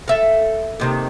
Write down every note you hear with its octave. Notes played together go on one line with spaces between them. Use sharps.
A4 E5 F5
D#2 C3 D#3